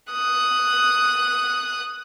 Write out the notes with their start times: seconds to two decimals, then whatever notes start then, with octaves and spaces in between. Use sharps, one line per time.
0.11 D#6 F#6